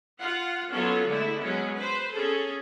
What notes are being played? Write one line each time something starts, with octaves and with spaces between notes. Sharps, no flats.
F4 F#5
F#3 B3 C#4 F4 A4
D3 G#3 A3 E4
F#3 G#3 B3 C#4
B4 C5
C#4 G#4 A4